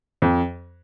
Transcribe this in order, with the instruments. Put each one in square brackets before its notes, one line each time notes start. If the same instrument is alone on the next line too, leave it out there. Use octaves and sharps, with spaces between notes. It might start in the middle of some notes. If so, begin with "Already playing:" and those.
[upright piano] F2